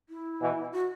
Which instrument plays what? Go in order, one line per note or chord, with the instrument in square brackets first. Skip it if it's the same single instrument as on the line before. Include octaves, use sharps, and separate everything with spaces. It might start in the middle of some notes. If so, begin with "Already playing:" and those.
[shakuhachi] E4
[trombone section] B2 E3
[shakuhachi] F#4